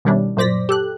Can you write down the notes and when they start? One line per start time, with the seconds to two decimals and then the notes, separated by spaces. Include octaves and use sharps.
0.05 B2 D#3 G3 C#4 D4 E4
0.37 F#2 A#2 C5 D5 A#6 B6
0.69 G4 A4 F#6